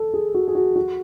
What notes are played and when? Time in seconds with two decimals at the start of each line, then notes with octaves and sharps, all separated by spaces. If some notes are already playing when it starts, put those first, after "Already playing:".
Already playing: A4
0.14 G#4
0.34 F#4
0.48 G#4
0.55 F#4
0.76 F#4